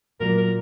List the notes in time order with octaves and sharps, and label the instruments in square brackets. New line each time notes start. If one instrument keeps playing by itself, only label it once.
[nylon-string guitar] A#2 F#3 A#3 [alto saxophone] A#4
[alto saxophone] A#4